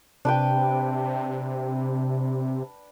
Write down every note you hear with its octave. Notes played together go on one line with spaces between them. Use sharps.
C3 D4 B4 G5